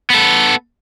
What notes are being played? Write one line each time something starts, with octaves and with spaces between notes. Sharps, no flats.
B3 A4